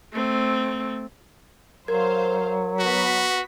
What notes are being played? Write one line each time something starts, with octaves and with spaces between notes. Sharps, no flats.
A3 C4
F#3 A#4 C5 F5 G#6
B3 F#4 B6